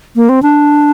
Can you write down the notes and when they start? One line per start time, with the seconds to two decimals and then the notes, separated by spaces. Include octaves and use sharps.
0.16 A#3
0.29 C4
0.42 D4